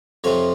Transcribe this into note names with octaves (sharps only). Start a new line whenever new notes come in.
F2 C3 F3 C#5